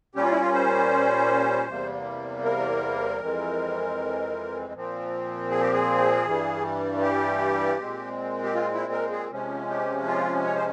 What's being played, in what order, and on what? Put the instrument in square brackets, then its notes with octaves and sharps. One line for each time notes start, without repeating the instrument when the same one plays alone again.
[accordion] A#2 G3 C#4 G4
F4
E4
F4
C5
E2 C3 G3 A#3
A#4
F2 E3 G#3 C4
A#2 F3 C4
G#4
G4
G#4
G2 E3 G3
G4
A#2 G#3 C4
G4
F4
E4
A#4
G#4
C3 F3 G#3 C#4
G4
F4
C#5
C5